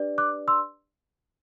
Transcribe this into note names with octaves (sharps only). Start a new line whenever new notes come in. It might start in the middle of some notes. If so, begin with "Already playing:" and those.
Already playing: D4 G4 B4 D5
D6 F#6
C6 E6